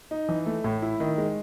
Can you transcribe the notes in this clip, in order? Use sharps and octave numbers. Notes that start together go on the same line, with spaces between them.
D#4
E3
A3
A2
E4
D#3
G#3